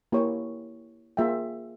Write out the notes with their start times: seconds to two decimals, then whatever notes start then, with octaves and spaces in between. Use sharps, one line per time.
0.12 A#3 E4 G4 C#5
1.17 A#3 F4 G#4 E5 G5